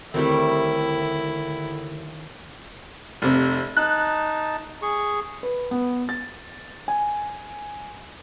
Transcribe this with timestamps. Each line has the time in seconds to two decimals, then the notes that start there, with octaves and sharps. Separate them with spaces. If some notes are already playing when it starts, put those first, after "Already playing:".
0.14 D#2 D3 G3 A3 C4 E4 A#4 D7
3.22 F1 C3
3.77 D#4 A5 F#6
4.82 G#4 C#6
5.43 B4
5.71 B3
6.09 A6
6.88 G#5